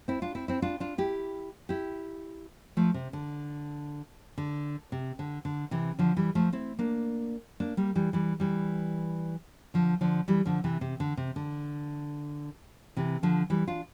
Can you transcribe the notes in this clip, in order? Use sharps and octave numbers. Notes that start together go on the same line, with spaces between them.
C4 E4
D4 F4
C4 E4
C4 E4
D4 F4
D4 F4
E4 G4
E4 G4
F3 A3
C3
D3
D3
C3
D3
D3
C3 E3
D3 F3
E3 G3
F3 A3
C4 E4
A#3 D4
A#3 D4
G3 A#3
E3 G3
E3 G3
E3 G3
D3 F3
D3 F3
E3 G3
D3 F3
C3 E3
C3
D3
C3
D3
C3 E3
D3 F3
E3 G3
D4 F4